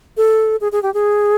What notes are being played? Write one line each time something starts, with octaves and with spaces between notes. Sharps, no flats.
A4
G#4
G#4
G4
G#4